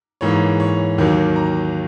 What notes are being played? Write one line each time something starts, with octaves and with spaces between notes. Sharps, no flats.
G#2 E3 A#3 C#5
C#5
D#2 D#3 F#3 A#3
A#5